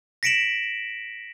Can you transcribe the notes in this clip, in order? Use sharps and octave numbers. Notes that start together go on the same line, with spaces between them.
A#6 B6 C#7 D7 E7 F#7